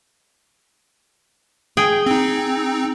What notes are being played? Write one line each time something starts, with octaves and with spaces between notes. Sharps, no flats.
G#4 G5
C4 D#4